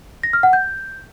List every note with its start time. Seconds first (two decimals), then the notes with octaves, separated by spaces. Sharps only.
0.23 A#6
0.33 F6
0.43 F#5
0.53 G6